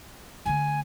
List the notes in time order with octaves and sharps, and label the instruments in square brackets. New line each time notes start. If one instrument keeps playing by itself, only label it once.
[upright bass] D3 A3 [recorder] G#5